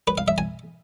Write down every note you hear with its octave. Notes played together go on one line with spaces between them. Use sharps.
B4
F5
E5
G#5